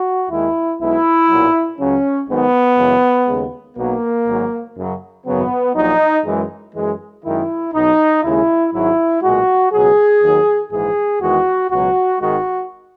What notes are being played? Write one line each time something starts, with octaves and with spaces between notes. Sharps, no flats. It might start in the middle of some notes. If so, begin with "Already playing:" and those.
Already playing: F#4
D#2 D#3 G#3 E4
B1 B2 G#3 E4
B1 A#2 F#3
C#2 C#3 F#3 C#4
G#1 G#2 D#3 F#3 B3
F#2 C#3 E3 G#3
D#2 C#3 G#3
B1 B2 F#3 A#3
G#1 G#2 F#3
F#2 C#3 F#3
G#1 F#2 C#3 F#3 B3
A#1 A#2 F#3 D#4
F#2 E3 G#3
F#2 E3 G#3
F#2 D#3 G#3 E4
B1 B2 F#3 D#4
D#2 C#3 G#3 E4
G#1 G#2 F#3 E4
B1 A#2 G#3 F#4
C#2 B2 F#3 G#4
D#2 D#3 F#3
A#1 G#2 E3 G#3 G#4
E2 D#3 G#3 F#4
C#2 B2 F#3 F#4
G#1 G#2 D#3 G#3 F#4